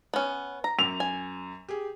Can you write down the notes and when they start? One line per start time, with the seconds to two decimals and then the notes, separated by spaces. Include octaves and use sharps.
0.14 B3 C#4
0.64 A#5
0.79 F#2 F7
1.00 G#5
1.68 G4 G#4